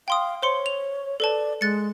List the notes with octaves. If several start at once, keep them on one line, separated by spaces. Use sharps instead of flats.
F5 G5 C6 D#6
C5 C#5 C6 C#7
F7
A4 B4 D5 A5
G#3 F#6 A6 C#7